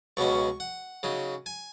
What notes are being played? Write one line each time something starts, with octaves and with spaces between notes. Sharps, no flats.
C#2 B2 F#3 C#4 C#6
F#5
C#3 F#3 D#4
G#5